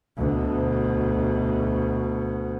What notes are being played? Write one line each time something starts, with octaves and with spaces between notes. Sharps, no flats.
D2 B2